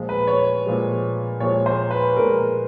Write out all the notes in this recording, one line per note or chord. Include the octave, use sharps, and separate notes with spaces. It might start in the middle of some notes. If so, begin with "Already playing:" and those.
Already playing: A#2 F3 G#3
B4
C#5
A#2 F3 G#3
A#2 F3 G#3 C#5
C5
B4
A#2 F3 G#3 A#4